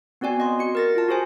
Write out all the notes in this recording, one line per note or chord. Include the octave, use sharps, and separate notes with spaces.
B3 C4 F#4 D5 G#5
D#5 C6
F#4 C#7
A#4 A6 A#6
F4 A5
F#4 G#4 C5 G#5